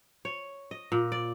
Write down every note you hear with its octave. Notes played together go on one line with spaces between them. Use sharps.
C#5
D#5
A#2
D5